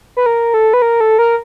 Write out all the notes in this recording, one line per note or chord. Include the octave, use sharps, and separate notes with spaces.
B4
A#4
A4
B4
A#4
A4
A#4